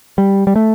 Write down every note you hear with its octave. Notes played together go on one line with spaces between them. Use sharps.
G3
G3
A3